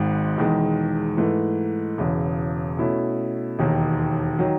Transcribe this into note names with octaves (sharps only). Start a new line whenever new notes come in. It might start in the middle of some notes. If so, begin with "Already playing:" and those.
Already playing: G#1 G#2 D#3
E1 E2 D#3 G#3
G#2 E3 A3
E1 E2 C#3
B2 A3 C#4 E4
E1 D#2 D#3
D#3 F#3